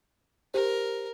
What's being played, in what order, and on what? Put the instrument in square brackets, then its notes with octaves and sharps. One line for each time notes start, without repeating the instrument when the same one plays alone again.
[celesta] G4 C5 [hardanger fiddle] A#4